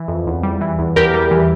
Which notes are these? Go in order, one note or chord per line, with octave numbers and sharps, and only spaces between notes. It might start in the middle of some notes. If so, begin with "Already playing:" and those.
Already playing: E3
F2
E2
G3
E3
E2
E2 G4 A#4
G3
E3